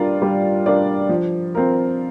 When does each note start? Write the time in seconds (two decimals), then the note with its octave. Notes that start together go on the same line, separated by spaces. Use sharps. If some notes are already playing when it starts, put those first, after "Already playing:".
Already playing: G3 D4 F4 A#4 D5
0.22 G3
0.66 D4 F4 A#4 D5
1.09 F3
1.55 C4 F4 A#4